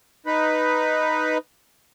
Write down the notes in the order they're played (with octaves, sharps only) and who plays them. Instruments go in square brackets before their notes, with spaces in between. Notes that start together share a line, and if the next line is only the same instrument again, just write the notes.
[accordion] D#4 B4